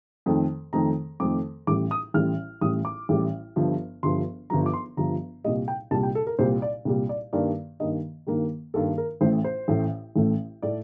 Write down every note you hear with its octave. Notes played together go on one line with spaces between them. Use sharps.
F2 D#3 A3
F2 D#3 A3 A#5
F2 D#3 A3 D6
A1 A2 G3 D6
D#6
A1 A2 G3 F6
A1 A2 G3 D#6
D6
A1 A2 G3
G1 G2 F3
G1 G2 F3 C6
G1 G2 F3 A#5
D6
C6
G1 G2 F3 A#5
C2 A#2 G3 D#5
G5
C2 A#2 G3 A5
G5
A4
A#4
C2 A#2 G3 C5
D5
C2 A#2 G3
D5
G2 D#3 A#3 D5
G2 D#3 A#3 D#5
G2 D#3 A#3
G2 D#3 A#3 A4
A#4
A1 A2 A3 C5
C5
A1 A2 A3
A1 A2 A3
A2 A3 D5